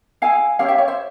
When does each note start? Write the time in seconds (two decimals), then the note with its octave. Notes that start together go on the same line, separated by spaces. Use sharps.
0.22 E4 G#4 F5 G#5
0.59 C#4 E4 G4 C#5 F5
0.68 E5 G5
0.78 C#5 F5
0.88 C5 E5